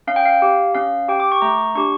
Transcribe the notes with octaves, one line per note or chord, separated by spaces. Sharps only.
C#4 F5
G5
F5
G4
C#4 F5
G4 G5
D6
C#6
A3 A#5
D4 G4 C#6